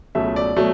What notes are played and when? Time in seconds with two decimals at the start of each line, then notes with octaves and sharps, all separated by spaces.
0.15 C#2 B2 F#3 A3 E5
0.36 D5
0.57 B2 F#3 A3